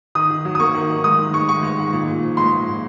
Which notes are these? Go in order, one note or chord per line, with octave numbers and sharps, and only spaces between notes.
D#3 D#6
D#3
F#3
D#6
A#3 C#6
D#3
D#3
G#3 D#6
D#3
G#3 C#6
D#3 C#6
G#3
D#3
A#2
A#2
F3
G#3 C6
A#2
A#2